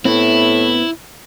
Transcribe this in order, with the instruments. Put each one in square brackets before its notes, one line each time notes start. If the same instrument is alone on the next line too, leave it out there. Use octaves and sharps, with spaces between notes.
[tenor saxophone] A2 [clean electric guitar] B3 C4 [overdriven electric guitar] E4